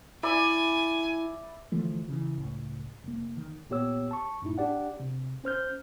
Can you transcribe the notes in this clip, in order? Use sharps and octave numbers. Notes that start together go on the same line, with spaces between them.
E4 D5 E5 G#5 B5
D3 E3 F3 A3
C#3 E3
C#2 A2
F1 A#3
D#3
A#2 B3 G4 C#5 E6
A5 C#6
F#2 A2 D#4 E4
D4 G4 D5 F#5
C3
C#4 C5 F6 G6